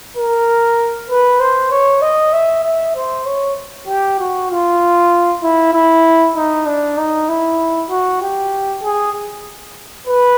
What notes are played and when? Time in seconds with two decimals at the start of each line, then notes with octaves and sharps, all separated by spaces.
0.17 A#4
1.10 B4
1.40 C5
1.71 C#5
2.02 D#5
2.33 E5
2.64 E5
2.96 C5
3.26 C#5
3.88 G4
4.20 F#4
4.50 F4
5.43 E4
5.74 E4
6.36 D#4
6.66 D4
6.98 D#4
7.29 E4
7.90 F#4
8.22 G4
8.83 G#4
10.07 B4